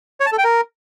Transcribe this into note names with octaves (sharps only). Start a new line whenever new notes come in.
C#5
A5
A4
G5
A#4